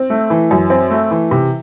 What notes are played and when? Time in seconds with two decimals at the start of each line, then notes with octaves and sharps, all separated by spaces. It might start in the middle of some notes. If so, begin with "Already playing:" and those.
Already playing: C4
0.10 A3
0.30 E3
0.51 F#2
0.70 C4
0.90 A3
1.11 E3
1.31 C3